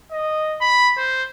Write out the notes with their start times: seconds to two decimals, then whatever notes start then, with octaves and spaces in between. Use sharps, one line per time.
0.12 D#5
0.61 B5
0.97 C5